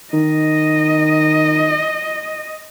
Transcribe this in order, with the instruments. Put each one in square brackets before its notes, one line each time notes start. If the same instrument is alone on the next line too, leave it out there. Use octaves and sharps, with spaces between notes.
[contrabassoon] D#3 [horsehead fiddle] D#5